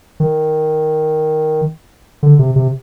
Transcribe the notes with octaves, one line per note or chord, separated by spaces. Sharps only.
D#3
D3
C3
C3